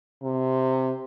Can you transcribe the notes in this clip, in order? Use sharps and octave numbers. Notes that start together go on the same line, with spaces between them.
C3